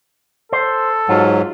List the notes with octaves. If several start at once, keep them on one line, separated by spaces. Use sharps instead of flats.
A4 C5
G#2 F#3 F4